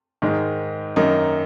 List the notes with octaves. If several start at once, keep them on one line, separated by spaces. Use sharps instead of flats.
G#2 D#3 G#3
F#2 D#3 A#3 D#4